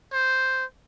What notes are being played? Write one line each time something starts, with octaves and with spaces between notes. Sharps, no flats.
C5